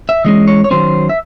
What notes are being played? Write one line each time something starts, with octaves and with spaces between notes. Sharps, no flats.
E5
E3 G#3 C#4 D#5
C#5
C#5
D#3 F#3 C#4 C5
E5